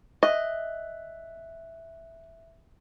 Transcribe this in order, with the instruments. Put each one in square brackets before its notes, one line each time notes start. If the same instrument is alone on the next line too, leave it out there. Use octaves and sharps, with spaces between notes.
[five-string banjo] D#5 [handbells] E5 F#6